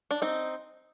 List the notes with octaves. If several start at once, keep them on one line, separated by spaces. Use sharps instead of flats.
D4
C4 D#4